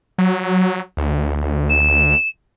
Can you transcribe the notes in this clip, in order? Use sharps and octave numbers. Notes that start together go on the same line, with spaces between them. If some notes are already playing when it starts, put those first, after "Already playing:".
F#3
D2
E7